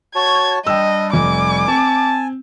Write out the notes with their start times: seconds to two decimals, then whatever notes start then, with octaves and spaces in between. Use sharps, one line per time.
0.15 F#4 C#5 A5 G#6
0.67 G3 D4 D#5 G5 E6
1.13 F1 G#5 D6
1.68 C4 A5